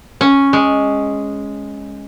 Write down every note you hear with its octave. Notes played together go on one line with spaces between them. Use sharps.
C#4
G#3